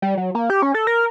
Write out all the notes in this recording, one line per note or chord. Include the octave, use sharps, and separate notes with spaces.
G3
F#3
A#3
G4
C#4
A4
A#4